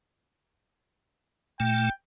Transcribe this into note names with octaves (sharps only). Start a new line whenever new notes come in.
A#2 A3 G5